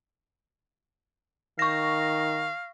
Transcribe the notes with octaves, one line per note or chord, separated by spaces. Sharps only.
D#3 F5 C#6 A#6